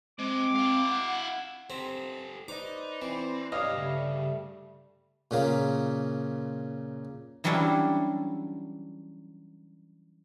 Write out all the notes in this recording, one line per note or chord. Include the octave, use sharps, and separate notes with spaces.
G#3 C4 D6
E4 F5
F#5
C4 G4 A4
D#4 B4 C5 D5 D#5 D6
E3 C4
B1 G2 G3 C#5 D#5 F5
C#3 G3 A3
A#2 C#3 A#3
E3 F#3 G3 C#4 D4 E4